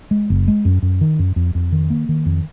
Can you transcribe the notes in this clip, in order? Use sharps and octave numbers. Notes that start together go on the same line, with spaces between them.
G#3
F#1
G#3
F#2
F#2
D#3
F#2
F2
F2
D#3
A#3
D#3
F2